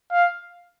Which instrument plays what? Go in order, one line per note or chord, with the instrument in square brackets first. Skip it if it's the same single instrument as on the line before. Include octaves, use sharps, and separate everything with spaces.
[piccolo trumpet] F5